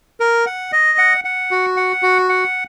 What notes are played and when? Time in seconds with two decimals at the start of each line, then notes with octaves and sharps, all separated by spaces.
0.20 A#4
0.46 F#5
0.72 D#5
0.98 F#5
1.24 F#5
1.51 F#4
1.77 F#5
2.03 F#4
2.29 F#5